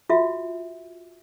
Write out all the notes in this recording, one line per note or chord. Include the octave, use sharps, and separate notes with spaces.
F4 F#4 E5